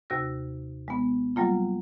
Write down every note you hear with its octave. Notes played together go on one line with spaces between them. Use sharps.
D#2 C3 F#4 E6 A#6
G#3 B3
F#3 G3 A#3 F4